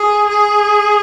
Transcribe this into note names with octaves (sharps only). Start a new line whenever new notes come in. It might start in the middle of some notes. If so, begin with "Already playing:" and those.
Already playing: G#4
G#4